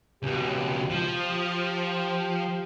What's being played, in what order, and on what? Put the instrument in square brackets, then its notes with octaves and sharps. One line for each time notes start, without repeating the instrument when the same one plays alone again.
[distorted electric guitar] C#2 B2 [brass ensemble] G4
[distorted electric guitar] F3